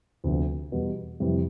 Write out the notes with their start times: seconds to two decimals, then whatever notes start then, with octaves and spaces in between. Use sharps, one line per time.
0.24 D2 C3 F3 B3
0.72 E2 B2 G3 B3
1.20 F2 C3 E3 G3